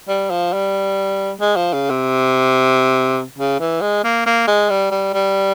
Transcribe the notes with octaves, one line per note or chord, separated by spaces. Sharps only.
G3
F3
G3
G#3
F3
C#3
C3
C#3
E3
G#3
A#3
A#3
G#3
G3
G3
G3